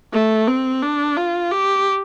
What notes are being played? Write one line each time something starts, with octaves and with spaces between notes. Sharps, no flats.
A3
C4
D4
F4
G4